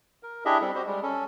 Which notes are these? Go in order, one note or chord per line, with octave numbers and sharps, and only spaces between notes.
A#4
D4 E4 G4 G#4 D#5 E5
G3 C4 A4
F#4 G4 C5 D#5
G3 G#3
C#4 A4